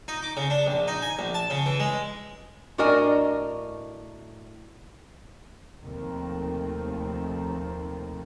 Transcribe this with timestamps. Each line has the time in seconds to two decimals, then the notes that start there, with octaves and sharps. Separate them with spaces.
0.08 D#4
0.23 D6
0.37 C#3
0.50 D4
0.67 A#1
0.88 D#4
1.02 G#5
1.19 A#1
1.34 A5
1.50 C#3
1.66 E3
1.80 G#3
2.78 A2 D4 F#4 A#4 D#5 G#5
5.83 D#2 C3 D#3 F3 A3 C4